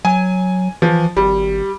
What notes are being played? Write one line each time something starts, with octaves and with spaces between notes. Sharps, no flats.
F#3 G#5
E3 F3
G#1 G3